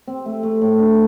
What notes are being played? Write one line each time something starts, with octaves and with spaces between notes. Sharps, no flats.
C4
A3
A3
A2
D4